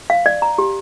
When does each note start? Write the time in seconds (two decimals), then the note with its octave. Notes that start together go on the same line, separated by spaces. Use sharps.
0.10 F5
0.26 D5
0.42 A#5
0.58 G4